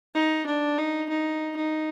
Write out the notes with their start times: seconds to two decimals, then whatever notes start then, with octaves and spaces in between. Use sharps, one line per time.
0.15 D#4
0.46 D4
0.78 D#4
1.09 D#4
1.56 D#4